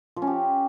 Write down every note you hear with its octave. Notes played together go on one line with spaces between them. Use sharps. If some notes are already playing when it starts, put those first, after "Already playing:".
F3
C#4
G4